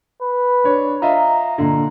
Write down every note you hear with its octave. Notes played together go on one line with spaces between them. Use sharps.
B4
D4 C#5
F4 D#5 E5 A#5
A#2 D3